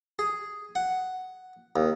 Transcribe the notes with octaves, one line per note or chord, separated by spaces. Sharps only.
G#4
F#5
D#2